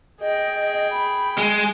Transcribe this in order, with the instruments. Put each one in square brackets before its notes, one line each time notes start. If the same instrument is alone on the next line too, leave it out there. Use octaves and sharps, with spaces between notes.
[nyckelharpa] G#4 G5 [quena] D#5
[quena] B5
[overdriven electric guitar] G#3 [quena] G#5